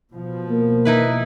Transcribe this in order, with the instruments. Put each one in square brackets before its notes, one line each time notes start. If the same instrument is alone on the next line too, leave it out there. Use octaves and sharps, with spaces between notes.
[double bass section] B2 F3
[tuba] A#3
[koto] D#4 E4 B4